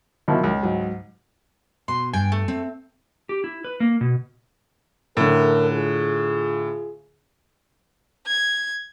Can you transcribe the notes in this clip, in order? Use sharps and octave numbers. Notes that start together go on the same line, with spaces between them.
B2 D#3 F3 F#3 E4
C#2
G#2 F#3
B2 C6
G2 G5 G#5
A3
C4
G4
E4
B4
A#3
B2
A2 D3 C#4 A4 A#4
F4 G#4
G#6